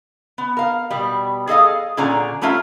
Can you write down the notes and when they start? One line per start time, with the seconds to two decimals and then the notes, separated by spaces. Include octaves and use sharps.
0.38 B3
0.57 A#4 F5
0.90 B2 G3
1.47 G#4 A4 D#5 F5
1.97 A#2 D3 C#4 G#4 D5 A#5
2.41 G3 A3 C#4 F4 A#4 E5